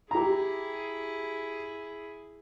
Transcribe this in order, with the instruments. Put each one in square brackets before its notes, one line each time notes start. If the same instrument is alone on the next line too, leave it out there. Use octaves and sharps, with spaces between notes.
[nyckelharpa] E4 G#4 [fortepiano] G4 A#5